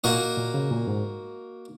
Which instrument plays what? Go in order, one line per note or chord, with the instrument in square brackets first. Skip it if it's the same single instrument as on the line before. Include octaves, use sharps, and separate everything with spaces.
[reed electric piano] A#2 [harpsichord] A#3 F#4 D#5
[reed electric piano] A#2
C#3
A#2
G#2